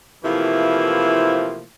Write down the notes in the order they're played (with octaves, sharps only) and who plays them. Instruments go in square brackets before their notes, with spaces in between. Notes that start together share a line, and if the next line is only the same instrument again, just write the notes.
[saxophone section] C3 E3 F3 A3 A#3 E4